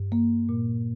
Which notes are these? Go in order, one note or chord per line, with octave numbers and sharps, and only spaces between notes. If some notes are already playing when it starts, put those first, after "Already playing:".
Already playing: G2
A#3
A#2